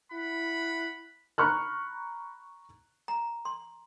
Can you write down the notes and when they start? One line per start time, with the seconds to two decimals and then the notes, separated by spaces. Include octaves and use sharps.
0.13 E4 F#5 B5
1.38 A#5 B5 C#6 F6 F#6
3.08 A#5
3.45 C6